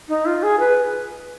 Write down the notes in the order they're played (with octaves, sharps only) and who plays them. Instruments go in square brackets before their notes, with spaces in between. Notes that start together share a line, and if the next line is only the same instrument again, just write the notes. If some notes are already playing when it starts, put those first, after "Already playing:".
[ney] D#4
F4
G#4
B4